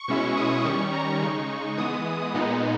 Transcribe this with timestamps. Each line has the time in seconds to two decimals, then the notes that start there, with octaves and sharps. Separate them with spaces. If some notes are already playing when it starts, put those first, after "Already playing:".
Already playing: C#6
0.08 B2 G#3 C#4 E4
0.37 D#6
0.65 D#3 G3 C#4 C#6
0.93 A#5
1.21 C#3 G#3 D#4 C#6
1.77 E3 G#3 B3 D#6
2.34 A#2 G#3 B3 D#4